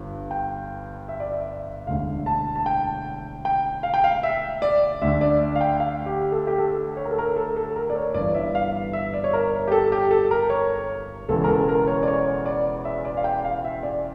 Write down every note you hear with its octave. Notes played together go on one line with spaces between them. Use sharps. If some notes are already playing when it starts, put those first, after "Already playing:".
Already playing: G1 G2
G5
E5
D5
E5
E1 D2 D3 F5
A5
A5
G5
G5
F5
G5
F5
E5
D5
D2 D3 E5
D5
F5
G5
F5
G4
A4
G4
A4
C#5
A#4
A4
A#4
A4
A4
A#4
D5
C#5
G1 G2 E3 D5
E5
F5
E5
D5
C#5
A#4
G4
A4
G4
A4
A#4
C#5
E1 E2 C#3 E3 A4
A#4
A4
A#4
C#5
D5
C#5
D5
E5
D5
F5
G5
F5
E5
D5